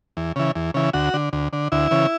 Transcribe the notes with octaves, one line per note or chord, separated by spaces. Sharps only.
E2
C#3 E3
E2
C#3 E3
D2 F#4
D3
D2
D3
D2 E4
C#3 E3